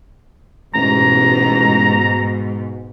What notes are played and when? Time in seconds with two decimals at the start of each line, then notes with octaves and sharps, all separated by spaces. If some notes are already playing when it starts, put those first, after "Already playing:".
0.75 A1 G#2 B2 A#5